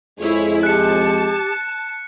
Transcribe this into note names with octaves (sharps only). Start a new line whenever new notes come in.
F2 G#3 E4 G#4 C#5
G4 A5 F#6 C#7